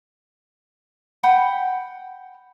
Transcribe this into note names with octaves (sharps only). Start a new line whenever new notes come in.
F#5 G5 B5